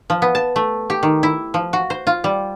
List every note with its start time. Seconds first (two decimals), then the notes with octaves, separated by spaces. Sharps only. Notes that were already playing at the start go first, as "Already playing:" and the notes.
0.10 F3
0.22 B3
0.35 A5
0.56 A3
0.90 G4
1.03 D#3
1.23 E4
1.54 F3
1.73 F#4
1.90 C5
2.07 F4
2.24 G3